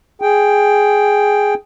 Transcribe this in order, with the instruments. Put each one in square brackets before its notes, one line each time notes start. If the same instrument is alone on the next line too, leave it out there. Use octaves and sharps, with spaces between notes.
[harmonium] G#4 G5